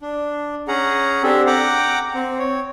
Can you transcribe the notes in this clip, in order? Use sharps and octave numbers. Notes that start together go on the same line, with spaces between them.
D4
C#4 G#4 F#5 A#5
C4 D4 G4 A4
F#5 G5 A#5 D6
C4
C#5